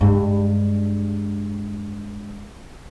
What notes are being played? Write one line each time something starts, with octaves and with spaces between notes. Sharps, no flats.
G2 G#3